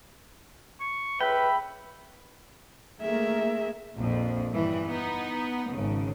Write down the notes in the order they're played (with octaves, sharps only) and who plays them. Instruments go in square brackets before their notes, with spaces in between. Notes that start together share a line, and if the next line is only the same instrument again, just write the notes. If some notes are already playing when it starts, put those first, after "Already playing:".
[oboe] C#6
[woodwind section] C#2 B5 [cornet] B4 [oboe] E5 [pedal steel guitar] G5
[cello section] A3 A#3 A#4 [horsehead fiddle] G#4 E5
[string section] A#1 F2
G2 E3 G3
B3 D#4
G#1 C#3